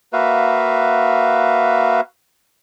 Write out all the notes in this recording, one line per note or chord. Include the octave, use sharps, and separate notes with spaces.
A#3 F#4 B4 E5 F5